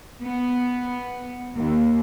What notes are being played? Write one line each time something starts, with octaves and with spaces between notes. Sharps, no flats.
B3
D#2